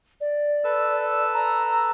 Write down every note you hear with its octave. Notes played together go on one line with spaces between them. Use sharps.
D5
A4 B4 E6
A#5